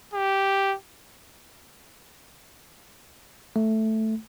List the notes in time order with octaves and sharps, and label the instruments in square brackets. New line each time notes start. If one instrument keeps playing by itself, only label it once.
[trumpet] G4
[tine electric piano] A3